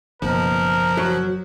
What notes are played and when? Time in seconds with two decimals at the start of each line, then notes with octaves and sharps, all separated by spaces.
0.22 F#1 B2 F3 A#4
0.97 F#3